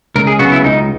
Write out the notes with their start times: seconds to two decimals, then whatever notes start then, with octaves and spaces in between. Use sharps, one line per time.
0.16 C#2 A#4
0.27 G#4
0.39 C#3 F#3 B3 F#4
0.52 E4
0.64 C#2 D#4